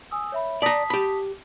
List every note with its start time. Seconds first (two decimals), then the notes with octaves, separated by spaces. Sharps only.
0.11 G#5 D#6 E6
0.32 C#5 E5 B5
0.62 D5 A5 A#5 D#6 B6
0.90 G4 B5